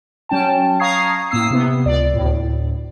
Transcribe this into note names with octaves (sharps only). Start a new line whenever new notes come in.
F#3 C#4 G5 A5
F5 A#5 C#6 D#6 G#6 C7
A2 A#3 D#6 E6 C7
C3 B3
C#2 D5
D2 A2